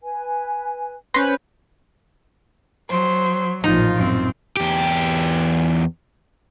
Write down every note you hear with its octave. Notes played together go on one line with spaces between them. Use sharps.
B4 G#5
C#4 B4 C5 B5 C6 G6 A#6 C7
F#3 C5
A1 A#2 F3 D#4 F4
F#2 C4
E2 G4